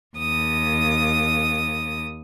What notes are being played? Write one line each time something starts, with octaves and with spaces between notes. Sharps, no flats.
D#2 D#6